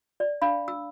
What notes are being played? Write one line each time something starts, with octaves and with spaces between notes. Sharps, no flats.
D5
D4 F5 B5
E6